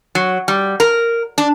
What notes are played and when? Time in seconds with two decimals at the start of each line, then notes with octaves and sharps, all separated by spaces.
0.15 F#3
0.48 G3
0.80 A#4
1.38 D4